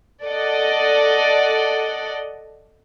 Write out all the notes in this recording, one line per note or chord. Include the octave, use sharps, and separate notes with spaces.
A4 D5 D#5 F#5